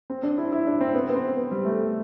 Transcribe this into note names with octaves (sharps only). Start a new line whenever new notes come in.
C4
D4
E4
E4
D4
C4
B3
B3
C4
B3
G3
A3